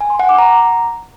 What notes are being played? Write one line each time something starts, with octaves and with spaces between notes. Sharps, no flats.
G#5
C6
F#5
D6
A#5